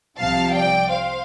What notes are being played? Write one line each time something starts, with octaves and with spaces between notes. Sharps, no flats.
C2 C3 F3 C4 F5 A5
D5 G5
C5 F5